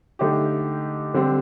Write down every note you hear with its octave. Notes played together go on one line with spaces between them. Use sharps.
D3 A3 D#4 G4
D3 G3 C4 G4